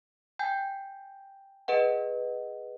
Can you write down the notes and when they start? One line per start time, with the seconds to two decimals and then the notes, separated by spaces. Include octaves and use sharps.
0.39 G5 G#5 G6
1.68 G#4 B4 D#5 F#5